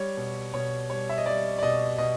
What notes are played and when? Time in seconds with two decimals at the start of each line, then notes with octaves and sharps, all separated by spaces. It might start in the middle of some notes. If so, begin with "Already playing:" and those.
Already playing: G3 C#5
0.17 B2
0.54 B2 C#5
0.90 G3 C#5
1.09 E5
1.18 D#5
1.26 G3 D5
1.58 D5
1.62 B2 D#5
1.98 B2 D#5